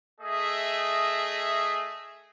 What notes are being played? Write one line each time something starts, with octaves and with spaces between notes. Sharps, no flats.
A3 G#4 D#5 E5